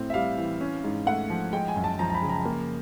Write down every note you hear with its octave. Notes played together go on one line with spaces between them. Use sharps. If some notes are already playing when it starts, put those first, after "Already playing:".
Already playing: A2 C4
E5
G3 F5
E3
C#4
G#2
A3 F#5
F3
G#3 G5
G#5
F#2
A5
F3 A#5
A#5
B5
C#3
A#5
A#3